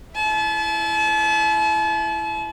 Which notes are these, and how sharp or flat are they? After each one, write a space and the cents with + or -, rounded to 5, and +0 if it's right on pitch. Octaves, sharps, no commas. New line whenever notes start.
E4 +15 A5 -40